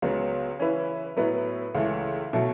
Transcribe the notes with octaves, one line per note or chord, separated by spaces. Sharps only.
C#2 C#3 F#3 B3
E3 C#4 E4 B4 E5
A2 F#3 B3 E4 B4
C#2 C#3 E3 A3
B2 F#3 A3